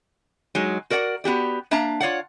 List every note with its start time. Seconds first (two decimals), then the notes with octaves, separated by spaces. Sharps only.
0.55 F#3 G#3 D#4
0.90 F#4 A#4 D5 F5 F#5
1.24 B3 F#4 G4 D5
1.71 A#3 D4 E5 F5 A5 A#5
2.01 F4 C#5 D5 F5 F#5